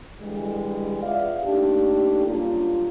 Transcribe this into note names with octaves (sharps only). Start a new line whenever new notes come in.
D3 E3 G3 G#3
B3 F4 D5 E5 F5
A3 A#3 D4 D#4 G4
F#3 G3 A#3 C#4 D4 F4